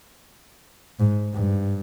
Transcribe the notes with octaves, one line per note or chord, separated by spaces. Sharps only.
G#2
G2